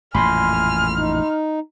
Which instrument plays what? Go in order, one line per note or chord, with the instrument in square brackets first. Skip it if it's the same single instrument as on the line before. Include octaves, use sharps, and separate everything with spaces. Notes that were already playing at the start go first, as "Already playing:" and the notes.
[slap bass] A1 F2 A#2 [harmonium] G#5 [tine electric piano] B5 C6 [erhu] F6
[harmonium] D#4